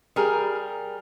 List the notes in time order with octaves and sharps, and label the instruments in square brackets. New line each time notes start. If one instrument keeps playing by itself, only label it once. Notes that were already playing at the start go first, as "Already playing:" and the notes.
[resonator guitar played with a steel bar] G3 G#4 A#4